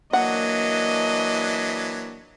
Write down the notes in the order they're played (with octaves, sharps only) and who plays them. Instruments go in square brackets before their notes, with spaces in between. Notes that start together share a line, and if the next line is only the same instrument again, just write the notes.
[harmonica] E3 F#3 D4 [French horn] A#3 [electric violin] D#5 [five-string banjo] F#5